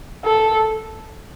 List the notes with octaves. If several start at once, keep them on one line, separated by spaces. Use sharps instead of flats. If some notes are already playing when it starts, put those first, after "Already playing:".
A4